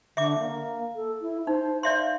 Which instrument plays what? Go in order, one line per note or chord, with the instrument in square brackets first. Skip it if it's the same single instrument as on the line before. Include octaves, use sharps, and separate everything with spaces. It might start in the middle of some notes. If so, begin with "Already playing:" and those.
[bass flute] D3 [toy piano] E5 D6
[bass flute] A#3
A4
E4
[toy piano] D#4 [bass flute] C5
[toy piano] D5 E5 C6 [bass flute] F5